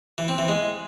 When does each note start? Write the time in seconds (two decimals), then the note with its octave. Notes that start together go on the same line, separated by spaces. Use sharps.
0.18 E3
0.28 C4
0.38 E3
0.48 G#3